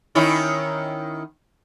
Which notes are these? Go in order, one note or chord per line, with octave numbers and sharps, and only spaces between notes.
D#3 C#4 E4